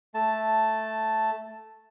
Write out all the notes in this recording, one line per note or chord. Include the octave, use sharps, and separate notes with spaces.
A3 A5